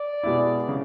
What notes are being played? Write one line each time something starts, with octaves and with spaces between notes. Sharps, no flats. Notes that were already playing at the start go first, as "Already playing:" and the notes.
Already playing: D5
B2 G#3 B3 E4
C#3